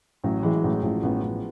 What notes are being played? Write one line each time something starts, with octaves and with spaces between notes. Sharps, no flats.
A1 F#3
E3 G#3
A1 F#3
A1 F3
A1 B3
A1